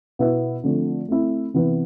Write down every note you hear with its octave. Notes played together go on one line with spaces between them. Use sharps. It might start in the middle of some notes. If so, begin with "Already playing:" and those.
B2 B3 E4 B4 E5
D3 F3 A3 C4
A3 C4 E4
C3 E3 B3 E4 B4